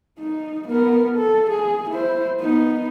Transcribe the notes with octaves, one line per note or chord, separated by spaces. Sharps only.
D#4
B3 A#4
A4
G#4
E4 C5
B3 D#4